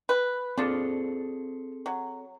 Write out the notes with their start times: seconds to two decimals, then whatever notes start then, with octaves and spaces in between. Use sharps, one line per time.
0.09 B4
0.58 F3 C4 D4 G#4 A4
1.86 F#3